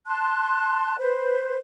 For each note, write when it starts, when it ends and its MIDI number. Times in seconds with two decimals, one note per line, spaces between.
0.06 0.96 81
0.06 0.96 84
0.06 0.96 90
0.98 1.57 71
0.98 1.57 72